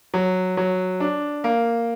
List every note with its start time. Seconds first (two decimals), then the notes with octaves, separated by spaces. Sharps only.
0.14 F#3
0.57 F#3
1.00 D4
1.44 A#3